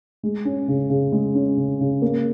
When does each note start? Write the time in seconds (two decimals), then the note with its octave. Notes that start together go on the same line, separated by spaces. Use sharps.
0.23 G#3
0.45 C#4
0.68 C#3
0.90 C#3
1.12 G#3
1.35 C#4
1.57 C#3
1.80 C#3
2.02 A#3